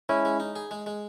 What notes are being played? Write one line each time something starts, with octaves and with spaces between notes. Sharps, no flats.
G#3 C#4 E4
G#3
D#4
G#4
G#3
G#3